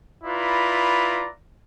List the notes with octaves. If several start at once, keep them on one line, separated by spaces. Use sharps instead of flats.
E4 F4 B4 D5 A#5